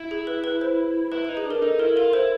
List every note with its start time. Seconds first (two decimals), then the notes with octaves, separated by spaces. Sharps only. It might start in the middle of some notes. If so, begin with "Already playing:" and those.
Already playing: E4
0.11 G#4
0.27 B4
0.44 B4
0.61 C5
1.12 E4 B4
1.25 D#4 B4
1.37 G#4
1.45 D4
1.51 A#4
1.62 D#4 A4
1.79 E4 A#4
1.96 F4 A#4
2.13 E4 C5